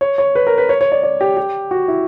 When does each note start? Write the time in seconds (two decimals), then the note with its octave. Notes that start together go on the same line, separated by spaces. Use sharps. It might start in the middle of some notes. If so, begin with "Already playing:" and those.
0.01 C#5
0.18 C#5
0.35 B4
0.47 A#4
0.58 B4
0.69 C#5
0.81 C#5
0.92 D5
1.03 D5
1.21 G4
1.37 G4
1.71 F#4
1.88 E4